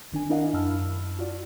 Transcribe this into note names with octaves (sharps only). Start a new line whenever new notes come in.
G1 D#3 D4 G#5
D4 E4 A#4 D#5 F5 F#5
F#2 E4 A5 B5 E6 F6
F4 F#4 D5